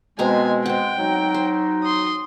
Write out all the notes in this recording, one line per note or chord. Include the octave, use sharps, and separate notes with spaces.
B2 G#3 C4 G#5 A#5
C4 F#5 G5
F#3 D#4
C5
C6 D#6